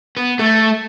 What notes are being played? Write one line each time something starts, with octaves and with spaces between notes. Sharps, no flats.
B3
A3